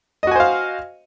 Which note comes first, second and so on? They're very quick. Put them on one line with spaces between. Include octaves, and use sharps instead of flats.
D#5 F#4 G#5 C5 F5